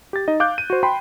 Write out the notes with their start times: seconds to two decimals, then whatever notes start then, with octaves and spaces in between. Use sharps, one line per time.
0.13 G4 A6
0.28 D#4 D#5
0.40 F5 D6 F#6 G6
0.58 D#7
0.70 F#4 C5
0.83 G5 B5 C6